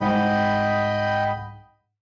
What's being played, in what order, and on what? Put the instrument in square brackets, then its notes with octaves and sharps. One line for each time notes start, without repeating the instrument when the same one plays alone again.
[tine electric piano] C2 G#2 F#5 [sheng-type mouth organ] D#5 G5 B5